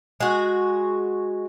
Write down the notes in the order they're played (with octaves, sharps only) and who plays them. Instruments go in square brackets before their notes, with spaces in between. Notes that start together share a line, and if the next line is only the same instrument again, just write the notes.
[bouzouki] G#3 F#4